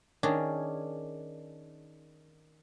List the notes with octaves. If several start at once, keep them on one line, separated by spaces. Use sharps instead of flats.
D#3 C#4 D4 G#4